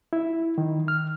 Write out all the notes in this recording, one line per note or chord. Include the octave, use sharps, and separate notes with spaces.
E4
D#3
F6